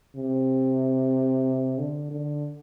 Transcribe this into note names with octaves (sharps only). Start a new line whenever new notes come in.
C3
D3
D3